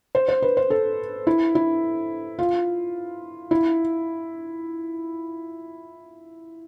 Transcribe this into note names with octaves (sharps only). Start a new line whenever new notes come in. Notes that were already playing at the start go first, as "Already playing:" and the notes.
C5
C5
B4
C5
A4
E4
E4
F4
E4